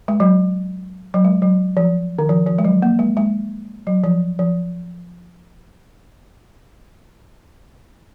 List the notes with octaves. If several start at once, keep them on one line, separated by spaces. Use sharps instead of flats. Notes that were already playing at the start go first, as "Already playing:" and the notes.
G#3
F#3
F#3
G#3
F#3
F3
D#3
F3
F3
G#3
F#3
A#3
G#3
G#3
F#3
F3
F3